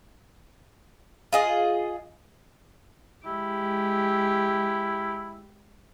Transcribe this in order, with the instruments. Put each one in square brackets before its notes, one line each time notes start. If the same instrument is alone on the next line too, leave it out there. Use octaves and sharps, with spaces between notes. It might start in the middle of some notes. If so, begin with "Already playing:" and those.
[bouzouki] F4 G#4 D#5
[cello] G#3 G4 [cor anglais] E4